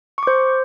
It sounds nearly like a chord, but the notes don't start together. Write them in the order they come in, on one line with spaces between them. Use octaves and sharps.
C#6 D6 C5